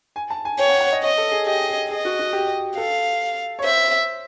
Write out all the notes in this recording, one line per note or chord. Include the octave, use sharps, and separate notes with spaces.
G#5
A5
G#5
C#5 G5
F#5
F#5
D#5
C#5 D#5
A4
G#4
G4 D#5
G#4
G#4 D#5
F#4
F#4
G4
A4 F5
C#5
C5 E5